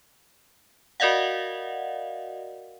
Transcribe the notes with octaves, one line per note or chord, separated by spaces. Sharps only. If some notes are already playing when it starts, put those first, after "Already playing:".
F#4 A#4 D5 D#5 F5 F#5